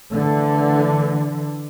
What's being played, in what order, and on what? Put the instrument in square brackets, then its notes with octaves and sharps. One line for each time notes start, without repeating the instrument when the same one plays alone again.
[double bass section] D3 E3 [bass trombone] A3